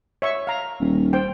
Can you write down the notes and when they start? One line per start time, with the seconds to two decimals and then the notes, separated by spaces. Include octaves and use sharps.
0.22 C#5 E5 C#6
0.47 F5 A#5
0.80 D#1
1.13 C5 G5